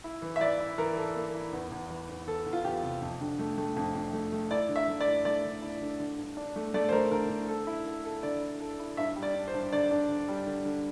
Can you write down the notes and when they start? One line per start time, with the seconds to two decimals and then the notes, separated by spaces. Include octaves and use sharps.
0.04 E4
0.22 E3
0.36 E5
0.41 E3 D5
0.60 E4
0.78 E3 A#4
0.97 A4
1.16 A#3
1.34 E4
1.52 E2
1.71 E2
1.90 E3
2.09 E2
2.27 E2 A4
2.46 E2
2.53 F4
2.65 E2 G4
2.83 C3
3.01 F2
3.21 D3
3.39 A3
3.58 A3
3.76 F2
3.95 F2
4.13 A3
4.32 A3
4.51 E4 D5
4.69 D3
4.76 E5
4.88 A3
5.01 D5
5.07 E4
5.25 A3 D5
5.44 D3
5.62 E4
5.81 D3
5.99 D3
6.18 G2
6.37 D4
6.56 A3
6.74 A3 D5
6.89 C5
6.92 A3 A#4
7.11 D3 A#4
7.30 D3
7.48 A4
7.67 E4
7.86 A4
8.05 A4
8.23 D3 D5
8.42 E4
8.60 A4
8.79 E4
8.97 G2 E5
9.16 G3
9.23 D5
9.34 D4
9.47 C5
9.54 G2
9.73 D3 D5
9.91 D4
10.09 D3
10.28 G3
10.47 D3
10.65 D3